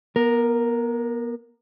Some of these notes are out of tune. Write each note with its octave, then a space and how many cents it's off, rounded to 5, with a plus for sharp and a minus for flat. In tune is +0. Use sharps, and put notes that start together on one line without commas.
B3 -35 A#4 +0